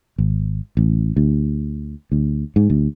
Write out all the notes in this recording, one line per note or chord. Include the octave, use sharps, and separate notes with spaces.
G#1
A1
D2
D2
G#2
D2